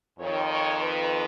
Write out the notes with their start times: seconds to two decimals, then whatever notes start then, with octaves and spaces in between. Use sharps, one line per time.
0.19 F2 D#3 C#5
0.50 C#5
0.82 B4